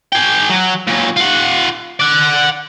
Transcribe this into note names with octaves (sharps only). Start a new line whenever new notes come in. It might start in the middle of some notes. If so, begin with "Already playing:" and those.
G#4 G5
F#3
A#2 F#3
F4 F#5
D5 F#5